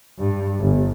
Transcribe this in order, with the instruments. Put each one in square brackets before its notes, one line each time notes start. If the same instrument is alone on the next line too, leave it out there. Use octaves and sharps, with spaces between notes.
[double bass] G2
G1